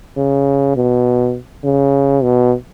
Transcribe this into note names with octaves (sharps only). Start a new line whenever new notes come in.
C#3
B2
C#3
B2